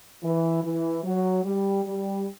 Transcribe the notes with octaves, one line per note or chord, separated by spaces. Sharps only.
E3
E3
F#3
G3
G3